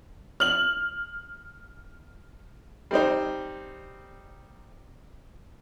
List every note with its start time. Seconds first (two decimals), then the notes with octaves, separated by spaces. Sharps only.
0.40 F6 F#7
2.91 G3 C4 D#4 C5